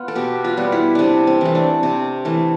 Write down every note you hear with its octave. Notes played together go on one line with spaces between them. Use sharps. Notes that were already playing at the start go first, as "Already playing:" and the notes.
Already playing: B3 F4
A4
B2 G4
F4
G3 B3
E4
C3 C4 D4
C4
E3 A3
D4
C3 C4
E3 A3